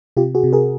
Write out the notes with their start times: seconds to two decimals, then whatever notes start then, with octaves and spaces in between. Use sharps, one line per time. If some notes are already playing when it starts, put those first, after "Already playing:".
0.17 C3 F4 G4
0.35 F#4 G#4
0.44 C3
0.53 G#4 A#4